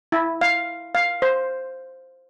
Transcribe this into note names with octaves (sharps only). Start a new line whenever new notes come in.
E4
F5
F5
C5